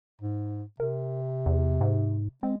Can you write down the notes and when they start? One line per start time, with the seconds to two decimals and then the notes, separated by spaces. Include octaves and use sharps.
0.21 G#2
0.80 C3 A#4
1.46 E2
1.81 G#2
2.43 G#3 C4